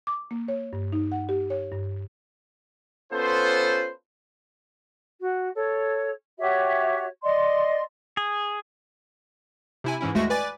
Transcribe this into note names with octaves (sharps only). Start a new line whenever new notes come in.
D6
A#3
C#5
G2
D#4
F#5
G4
C#5
G2
B3 C#4 F4 A4 B4 C5
F#4
A4 C#5
F#4 G4 C#5 E5
D5 D#5 C6
G#4
C3 E4 G#5
G#2 E3 C#4 E4
D#2 G#3 A3 F#4 A#6 C#7
B4 D5 G#5 D6 A6